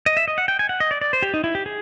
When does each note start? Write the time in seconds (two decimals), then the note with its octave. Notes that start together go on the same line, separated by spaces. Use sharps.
0.06 D#5
0.17 E5
0.28 D#5
0.38 F#5
0.48 G5
0.59 G#5
0.69 F#5
0.80 D#5
0.91 D5
1.01 D5
1.13 C5
1.23 G4
1.34 D#4
1.44 E4
1.55 G4
1.66 G#4